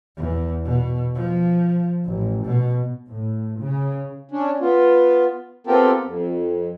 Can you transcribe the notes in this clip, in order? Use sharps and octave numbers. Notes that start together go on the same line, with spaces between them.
E2
B2
F3
A1
B2
A2
C#3
C#4 D4
B3 F4
B3 C4 F4 G4 A4 A#4
F2